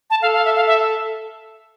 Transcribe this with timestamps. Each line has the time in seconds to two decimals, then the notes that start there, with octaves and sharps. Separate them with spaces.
0.10 A5
0.22 A4 F5
0.33 F5
0.45 E5
0.56 F5
0.67 E5